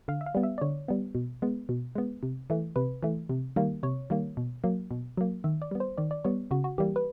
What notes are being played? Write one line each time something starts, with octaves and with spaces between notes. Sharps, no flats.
D3 F5
E5
F5
G3 B3
E5
D5
D3 C#5
G3 B3
B2
G#3 B3
B2
G#3 B3
C3
E3 A3
C3 B4
E3 A3
C3
D#3 G3 A#3
C3 C#5
D#3 G3 A#3
B2
F#3 A#3
B2
F#3 A#3
D#3 E5
D5
G3 B3
C5
D#3 D5
D5
G3 B3 C#5
C#3 F#4
F#4
E3 G3 A#3 G4
B4